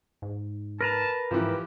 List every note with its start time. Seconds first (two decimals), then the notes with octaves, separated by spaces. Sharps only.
0.22 G#2
0.81 A#4 B4 A5 A#5
1.31 G#2 E3 F3 G4